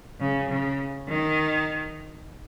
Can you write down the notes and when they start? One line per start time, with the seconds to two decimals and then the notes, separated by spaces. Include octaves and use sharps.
0.19 C#3
0.49 C#3
1.09 D#3